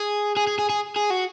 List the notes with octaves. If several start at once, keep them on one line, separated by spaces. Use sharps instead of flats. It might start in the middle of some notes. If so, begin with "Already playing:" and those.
Already playing: G#4
G#4
G#4
G#4
G#4
G#4
F#4